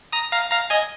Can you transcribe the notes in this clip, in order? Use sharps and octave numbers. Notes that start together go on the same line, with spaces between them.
A#5 D#6
F5 A#5
F5 A#5
D#5 G#5